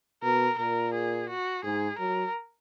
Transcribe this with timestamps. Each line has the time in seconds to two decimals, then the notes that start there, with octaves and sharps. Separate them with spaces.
0.23 B2 A#4
0.58 A#2 A#4
0.94 G#4
1.29 F#4
1.64 G#2 G#4
1.99 F#3 A#4